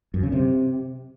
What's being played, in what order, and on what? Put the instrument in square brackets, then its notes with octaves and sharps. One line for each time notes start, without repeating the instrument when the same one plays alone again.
[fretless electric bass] F#2
C#3
C3